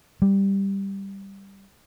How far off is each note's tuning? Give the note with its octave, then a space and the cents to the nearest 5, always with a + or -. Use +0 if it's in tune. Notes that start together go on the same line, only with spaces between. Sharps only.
G3 +5